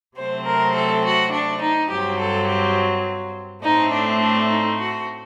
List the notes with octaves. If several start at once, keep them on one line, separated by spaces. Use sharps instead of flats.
C3 F#3 A3 C4 C5
A#4
A4
F#4
D4
D#4
G2 F#3 C4 G4
A4
G4
A2 A3 C4 D#4
D4
D4
D#4
F#4